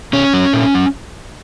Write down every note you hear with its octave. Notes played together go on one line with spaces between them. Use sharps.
B2 C#4
F#3
A#2
F#3